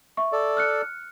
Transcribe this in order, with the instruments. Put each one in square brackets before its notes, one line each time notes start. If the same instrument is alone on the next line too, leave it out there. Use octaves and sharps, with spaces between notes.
[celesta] E5 C#6
[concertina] A4 D5
[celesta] F6 F#6 C#7